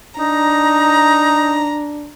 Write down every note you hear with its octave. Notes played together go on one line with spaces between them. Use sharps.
D4 D#4 A#5